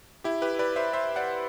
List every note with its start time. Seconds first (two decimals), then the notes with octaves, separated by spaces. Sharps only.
0.24 E4 G4
0.42 G4 B4
0.59 B4 D5
0.76 C5 E5
0.93 C5 E5
1.16 D5 F#5